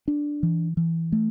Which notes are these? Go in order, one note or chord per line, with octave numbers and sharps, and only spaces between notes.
D4
E3
E3
A3